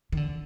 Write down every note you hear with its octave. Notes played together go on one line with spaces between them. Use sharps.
D#3
D3